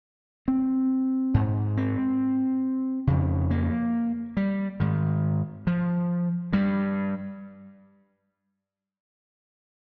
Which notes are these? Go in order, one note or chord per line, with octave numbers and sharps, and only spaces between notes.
C4
G#2
C4
F2 C#3
A#3
G3
G#2 D#3
F3
G2 G3